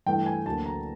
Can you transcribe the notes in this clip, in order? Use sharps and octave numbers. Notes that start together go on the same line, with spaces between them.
G2 E3 A3 G5
G#5
D2 D3 F#3 A#3 A5
A#5